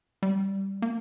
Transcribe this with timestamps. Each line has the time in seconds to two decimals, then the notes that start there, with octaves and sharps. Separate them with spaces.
0.23 G3
0.82 A#3